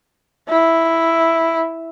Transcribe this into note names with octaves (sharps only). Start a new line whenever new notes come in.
E4